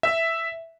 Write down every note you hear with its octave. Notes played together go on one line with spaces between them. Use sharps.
E5